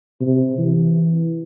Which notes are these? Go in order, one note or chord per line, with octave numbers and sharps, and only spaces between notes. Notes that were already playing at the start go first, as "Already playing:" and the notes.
C3
E3